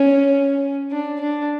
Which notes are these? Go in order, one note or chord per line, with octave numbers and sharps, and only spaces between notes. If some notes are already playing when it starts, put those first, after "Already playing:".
Already playing: C#4
D4
D4